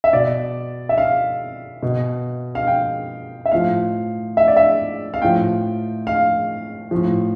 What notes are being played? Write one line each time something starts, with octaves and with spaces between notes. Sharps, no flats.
E5
B2 D5
E5
F5
B2
F5
G5
E5
A2 F3 F5
E5
D5
E5
F5
A2 F3 G5
F5
A2 F3